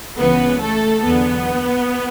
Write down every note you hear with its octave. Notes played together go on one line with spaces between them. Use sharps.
C#2 C#3 E3 B3 B4
A3 A4
E2 D3 F#3 B3